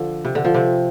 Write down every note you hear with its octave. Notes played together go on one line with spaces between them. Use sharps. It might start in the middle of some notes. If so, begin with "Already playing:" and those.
Already playing: D3 F3
C3
D3
F3
C3 C4